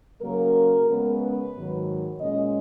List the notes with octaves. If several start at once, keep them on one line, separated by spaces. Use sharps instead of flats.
C#3 F#3 A#3 A#4
C#3 G#3 B3
B4
G#2 D#3 F#3
A#2 G#3 C#4 D#5